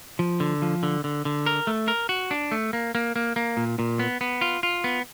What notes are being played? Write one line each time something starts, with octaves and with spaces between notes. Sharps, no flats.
F3
D3
F3
D3
D3
D3
A#4
A3
A#4
F#4
D4
A3
A#3
A#3
A#3
A#3
A#2
A#2
B3
B3
F4
F4
B3